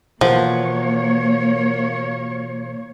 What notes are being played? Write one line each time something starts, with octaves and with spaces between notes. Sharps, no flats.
B2 E3 F3 A#3 E4 A#4 C#5 F#5